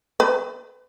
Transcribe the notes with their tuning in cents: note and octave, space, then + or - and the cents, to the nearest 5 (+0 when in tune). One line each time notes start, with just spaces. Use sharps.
B4 +35